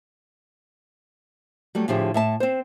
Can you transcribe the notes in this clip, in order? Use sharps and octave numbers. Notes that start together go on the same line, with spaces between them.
F#3 G3 A3
A2 D3 F3 A3 G4 G#4
A2 E5 A5
C4 C5